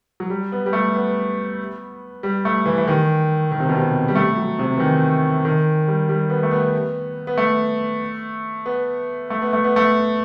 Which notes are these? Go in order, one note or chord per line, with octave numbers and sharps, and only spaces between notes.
F#3
G3
B3
G3
A3
B3
G3
A3
E3
E3
D#3
D#3
C3
B2
C3
G3
A3
F#3
C3
E3
D#3
D#3
G3
G3
B3
A3
B3
B3
A3
B3
A3
B3
A3
B3
A3